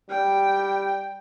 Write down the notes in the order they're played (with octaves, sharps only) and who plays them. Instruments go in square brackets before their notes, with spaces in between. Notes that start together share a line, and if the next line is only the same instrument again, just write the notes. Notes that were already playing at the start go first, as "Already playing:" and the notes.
[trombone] G3 [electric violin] G5